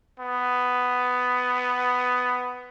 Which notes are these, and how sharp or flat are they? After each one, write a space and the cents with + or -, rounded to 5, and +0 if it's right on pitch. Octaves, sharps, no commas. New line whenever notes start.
B3 +10